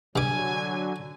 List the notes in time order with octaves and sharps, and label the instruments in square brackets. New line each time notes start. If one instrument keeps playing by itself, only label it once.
[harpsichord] G2 D6 [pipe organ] D3 F#3 [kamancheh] G#5